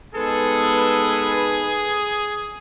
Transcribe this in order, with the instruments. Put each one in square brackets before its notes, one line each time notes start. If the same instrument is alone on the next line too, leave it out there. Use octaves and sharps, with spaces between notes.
[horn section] G#3 B3 A4 [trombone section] D#4 B4 [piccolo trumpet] G#4